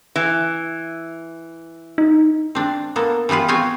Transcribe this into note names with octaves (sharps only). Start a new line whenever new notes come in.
E3
D#4
C4 D4
A#3 B3 A4
E3 G3 B3 F4 B4
B3 C4 F4 C#5 G#5